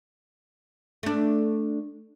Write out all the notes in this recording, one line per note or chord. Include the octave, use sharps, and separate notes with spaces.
A3 D4